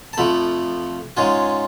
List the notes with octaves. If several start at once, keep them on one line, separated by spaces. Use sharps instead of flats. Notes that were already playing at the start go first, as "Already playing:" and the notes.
A5
F2 F3 A3 B5
G#2 G#3 C#4 F4 G#5